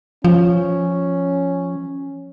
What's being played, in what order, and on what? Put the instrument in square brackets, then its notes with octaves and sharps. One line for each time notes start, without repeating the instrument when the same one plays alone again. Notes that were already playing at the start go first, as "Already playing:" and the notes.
[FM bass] F3 [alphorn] C#4